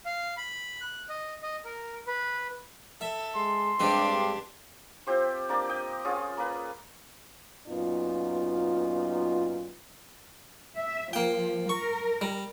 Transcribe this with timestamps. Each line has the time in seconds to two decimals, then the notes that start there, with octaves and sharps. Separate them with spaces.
0.06 F5
0.37 B5
0.81 F#6
1.09 D#5
1.43 D#5
1.65 A#4
2.07 B4
3.01 A4 E5
3.36 G#3 C6
3.80 G2 G#3 C4 D4 G4
5.07 C4 F4 G4 C5
5.49 A#3 D4 G4 D5
5.69 D#5 G5
6.05 C#4 F4 G#4
6.37 A#3 B4
7.67 F#2 A#2 B3 D#4 F4
10.78 E5
11.13 F3 A#3 G5
11.69 A#4 C#6
12.21 G3